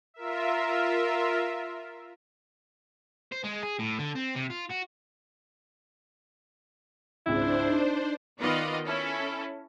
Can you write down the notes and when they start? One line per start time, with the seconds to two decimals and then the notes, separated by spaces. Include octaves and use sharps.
0.14 F4 A#4 E5
3.32 C5
3.44 G#3
3.63 G#4
3.79 A2
3.99 D3
4.16 C4
4.36 C3
4.51 F4
4.70 F#4
7.26 G#1 C#2 D4 E4 C5
7.69 D#4
8.39 D#3 B3 F4 B4 D5 D#5
8.87 C#4 E4 A4